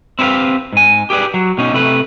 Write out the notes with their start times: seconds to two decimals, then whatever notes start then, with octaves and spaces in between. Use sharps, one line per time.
0.19 C4 E4 G4 G#4 B4 F5
0.73 G#2 G#5
1.10 G4 G#4 B4 D5
1.34 F#3
1.58 B2 C#4 D#4
1.73 C3 A3 B4